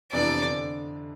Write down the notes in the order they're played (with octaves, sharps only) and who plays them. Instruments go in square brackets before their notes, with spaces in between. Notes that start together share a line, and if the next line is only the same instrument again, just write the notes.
[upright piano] F2 C3 E3 B3 D4 [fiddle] D5
[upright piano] D3